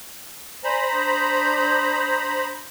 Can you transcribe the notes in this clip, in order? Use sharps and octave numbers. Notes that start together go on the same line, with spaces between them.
C5 D5 G#5 A#5 B5
D4 D#6 G6